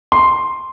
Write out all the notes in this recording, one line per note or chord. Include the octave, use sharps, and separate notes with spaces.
C6